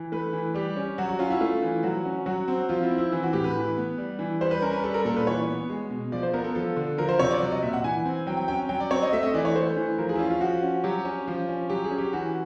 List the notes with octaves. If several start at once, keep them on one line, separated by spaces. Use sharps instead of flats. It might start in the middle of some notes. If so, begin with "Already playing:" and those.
Already playing: E3
A3 B4
E3
G3 G4
C#4
F#3 F#4
F#4
C#4 F4
E4
A3 F4
E3
F#3 F#4
C#4
F#3 F#4
C4
F3 F4
E4
C4
E4
E3
F#4
A2 G4
B4
E3
B3
G3
E3
G3 C5
B4
C#4 A#4
B4
G3 A4
A#4
A#2 A4
B4
E3 C#5
B3
G#3
B2
F3 D5
C5
B3 A#4
A4
F3 A4
D3
F3 A#4
C5
C3 C#5
D5
F#3 D5
D#5
A#2 E5
F#5
E3 G#5
C4
F#3 G5
G5
C#4 G5
F#3 G5
D5
C4 C#5
D#5
A3 E5
D#5
E3 D5
C#5
A3 C5
E3
F3 A#4
G#4
E4
C#4 F4
F4
F3 F#4
C#4
F#3 G4
C#4
F3
C#4
F#3 G4
G#4
C#4
G4
E3 F#4